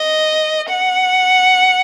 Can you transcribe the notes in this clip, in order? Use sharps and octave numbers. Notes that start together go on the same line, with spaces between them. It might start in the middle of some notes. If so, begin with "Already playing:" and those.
Already playing: D#5
F#5